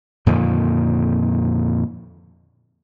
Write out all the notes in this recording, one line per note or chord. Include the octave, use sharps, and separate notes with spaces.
F2 A#2 D3 D#3